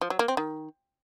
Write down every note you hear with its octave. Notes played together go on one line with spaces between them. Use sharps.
F3
F#3
A#3
C4
D#3